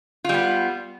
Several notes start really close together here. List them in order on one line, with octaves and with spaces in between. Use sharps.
F4 G3 B3